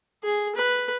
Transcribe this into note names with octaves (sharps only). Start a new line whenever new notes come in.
G#4
B4